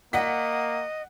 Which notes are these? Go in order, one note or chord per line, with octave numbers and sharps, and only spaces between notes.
A#3 D#5 F#5 B6